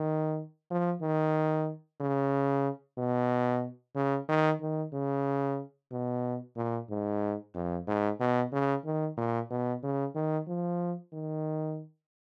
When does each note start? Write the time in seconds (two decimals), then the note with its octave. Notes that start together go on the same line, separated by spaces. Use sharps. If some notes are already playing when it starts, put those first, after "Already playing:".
Already playing: D#3
0.70 F3
1.02 D#3
2.00 C#3
2.98 B2
3.95 C#3
4.28 D#3
4.61 D#3
4.93 C#3
5.91 B2
6.56 A#2
6.90 G#2
7.54 F2
7.87 G#2
8.20 B2
8.52 C#3
8.85 D#3
9.17 A#2
9.50 B2
9.83 C#3
10.15 D#3
10.47 F3
11.13 D#3